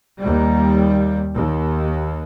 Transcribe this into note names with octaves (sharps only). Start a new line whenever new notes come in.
D#2 G3
D#2